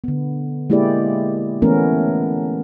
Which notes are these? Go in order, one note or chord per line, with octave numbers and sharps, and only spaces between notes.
D3 B3
G#3 A#3 E4 G4 G#4 D5
E3 A3 B3 C#4 A#4